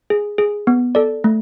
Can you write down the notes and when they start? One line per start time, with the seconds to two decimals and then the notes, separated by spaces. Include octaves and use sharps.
0.10 G#4
0.38 G#4
0.67 B3
0.95 A4 D5
1.24 A3